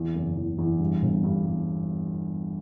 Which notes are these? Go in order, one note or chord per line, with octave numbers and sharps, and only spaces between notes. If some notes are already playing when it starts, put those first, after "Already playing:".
Already playing: E2
F#1
E2
E2
G2
G1
G2
G2